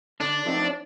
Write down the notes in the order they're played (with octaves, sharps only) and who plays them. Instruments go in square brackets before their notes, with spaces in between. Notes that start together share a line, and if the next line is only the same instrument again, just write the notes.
[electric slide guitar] D3 [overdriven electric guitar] D4
[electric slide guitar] F3 A3 C4 D#4